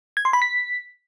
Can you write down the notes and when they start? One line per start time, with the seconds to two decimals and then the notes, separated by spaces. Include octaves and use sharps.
0.17 G#6
0.25 C6
0.33 B5
0.42 B6